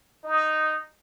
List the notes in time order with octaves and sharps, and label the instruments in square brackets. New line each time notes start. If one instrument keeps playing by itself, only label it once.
[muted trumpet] D#4